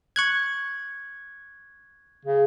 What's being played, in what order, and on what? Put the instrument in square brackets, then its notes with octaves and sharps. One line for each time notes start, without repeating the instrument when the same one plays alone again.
[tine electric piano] C#6 F#6 G#6
[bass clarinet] C#3